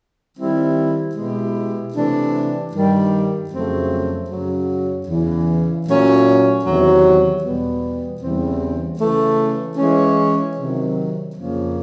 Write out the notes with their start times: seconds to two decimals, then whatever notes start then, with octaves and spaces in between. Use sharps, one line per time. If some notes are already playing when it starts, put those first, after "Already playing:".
0.38 D#3 G3 C4 E4
1.15 B2 G#3 B3 E4 G4
1.94 C3 E3 A3 D4
2.72 G2 D#3 G3
3.50 F2 C#3 F#3 A3 C4
4.29 F#2 C#3 F#3
5.07 E2 C#3 E3
5.85 A#2 F#3 A3 C#4
6.64 E2 C3 D#3 F#3
7.42 E2 B2 G3 B3
8.21 E2 C#3 E3 G3 C4
8.99 C#3 E3 A3
9.77 E3 G#3 C#4
10.56 C3 D#3 F#3
11.35 F2 C#3 F3 A#3 C#4